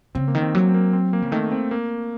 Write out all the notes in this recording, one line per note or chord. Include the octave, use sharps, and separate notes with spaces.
C#3 C4
A#3
D#3
C4
F#3 A#3
C4
A#3
C4
A#3
C#3
D#3 A3
C4
A#3